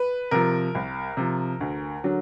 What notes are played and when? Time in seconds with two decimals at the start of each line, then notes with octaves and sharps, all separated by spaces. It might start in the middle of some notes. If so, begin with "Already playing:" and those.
Already playing: B4
0.31 C3 F3 A#4
0.75 C2
1.17 C3 F3
1.61 D2
2.04 D3 F#3